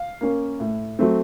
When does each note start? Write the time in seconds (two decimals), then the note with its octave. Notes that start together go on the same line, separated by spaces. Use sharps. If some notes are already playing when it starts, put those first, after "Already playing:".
Already playing: F5
0.21 A#3 C#4
0.60 A2
0.99 F#3 A3 C4